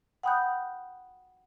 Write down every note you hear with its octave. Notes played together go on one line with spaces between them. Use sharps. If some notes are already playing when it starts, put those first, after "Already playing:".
F#5 G5 B5 D#6 F#6 G6